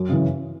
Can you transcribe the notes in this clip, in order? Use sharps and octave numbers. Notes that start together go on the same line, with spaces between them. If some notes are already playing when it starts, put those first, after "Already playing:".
Already playing: F#2
C#3 E3